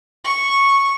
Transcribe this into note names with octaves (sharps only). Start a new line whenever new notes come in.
C#6